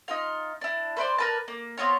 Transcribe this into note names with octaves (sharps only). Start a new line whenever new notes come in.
D#4 F4 F5
D4 E4
B4 C5 D5 C6
A#4 B4 A5
A#3
B3 C4 F4 C#5